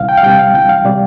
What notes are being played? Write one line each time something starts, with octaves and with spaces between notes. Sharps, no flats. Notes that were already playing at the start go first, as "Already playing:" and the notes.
Already playing: C2 F5
G5
F5
C3 G3 G5
F5
C2 G5
F5
C3 G3 D5